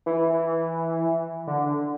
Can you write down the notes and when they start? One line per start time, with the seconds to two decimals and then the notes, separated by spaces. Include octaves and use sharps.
0.06 E3
1.47 D3